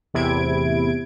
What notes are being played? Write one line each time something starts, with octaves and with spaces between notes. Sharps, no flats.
A1 E2 C3 E4 G#6 D7